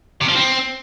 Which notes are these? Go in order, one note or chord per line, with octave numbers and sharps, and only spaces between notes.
C3
F3
C4